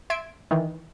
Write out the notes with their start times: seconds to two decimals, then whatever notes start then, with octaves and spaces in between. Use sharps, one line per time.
0.10 E5 C6 G#6 D7
0.51 D#3 E3